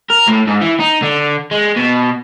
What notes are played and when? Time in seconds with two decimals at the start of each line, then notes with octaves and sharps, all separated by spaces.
0.10 A#4
0.27 A2
0.47 G#2
0.61 E3
0.80 D#4
1.02 D3
1.51 G#3
1.77 B2